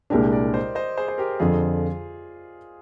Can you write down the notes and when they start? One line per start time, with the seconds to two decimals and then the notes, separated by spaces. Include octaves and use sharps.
0.10 C2 A#2 G#3 D4 G4 A#4
0.32 A#4 D5
0.53 C5 D#5
0.75 C5 D#5
0.97 G#4 C5
1.08 C5
1.18 G4 A#4
1.40 F2 D3 F3 F4 G#4